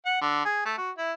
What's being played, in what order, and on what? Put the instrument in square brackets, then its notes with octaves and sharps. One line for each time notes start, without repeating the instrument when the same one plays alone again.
[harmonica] F#5
D3
G#4
A3
F#4
E4